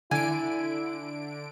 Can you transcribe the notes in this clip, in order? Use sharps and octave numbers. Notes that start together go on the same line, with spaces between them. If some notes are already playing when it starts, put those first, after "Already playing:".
D3 E4 G#5 D7